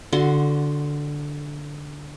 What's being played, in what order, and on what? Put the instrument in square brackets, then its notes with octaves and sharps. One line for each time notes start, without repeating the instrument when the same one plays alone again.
[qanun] D3 F#4 C6